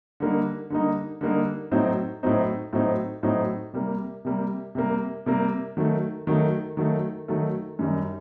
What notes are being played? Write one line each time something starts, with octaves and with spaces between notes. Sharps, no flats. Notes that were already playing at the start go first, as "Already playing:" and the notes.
D3 G3 A#3 D#4
D3 G3 A#3 D#4
D3 G3 A#3 D#4
A2 F#3 C4 D#4
A2 F#3 C4 D#4
A2 F#3 C4 D#4
A2 F#3 C4 D#4
C3 G3 A#3
C3 G3 A#3
C3 G3 A#3
C3 G3 A#3
D#3 F#3 A3
D#3 F#3 A3
D#3 F#3 A3
D#3 F#3 A3
F#2 D#3 G3